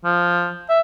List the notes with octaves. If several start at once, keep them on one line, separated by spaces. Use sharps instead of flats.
F3
E5